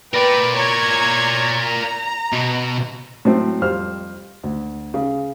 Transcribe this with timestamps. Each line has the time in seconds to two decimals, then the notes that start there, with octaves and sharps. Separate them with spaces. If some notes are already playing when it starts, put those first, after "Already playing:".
0.13 A#4 B4 D5 G5
0.55 C#5 A#5 G#6
1.58 A#5
2.32 B2
3.25 A2 F#3 C4
3.62 F2 G3 C5 F6
4.43 D2
4.94 C#3